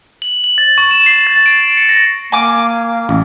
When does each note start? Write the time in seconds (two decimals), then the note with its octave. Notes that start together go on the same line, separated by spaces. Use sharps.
0.22 F#7
0.44 F#7
0.58 A6
0.78 C#6
0.91 E7
1.06 C7
1.27 A6
1.46 D7
1.77 C#7
1.89 A#6
2.32 A#3 G#5 D6
3.09 A1